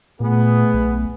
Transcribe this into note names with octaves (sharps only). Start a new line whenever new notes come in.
A#2 A3 B3 G#4
B1